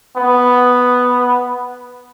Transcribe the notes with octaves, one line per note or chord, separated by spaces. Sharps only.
B3